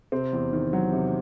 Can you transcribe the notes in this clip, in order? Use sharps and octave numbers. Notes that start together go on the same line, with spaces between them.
C3 C4
E2
D#3
F#3
C3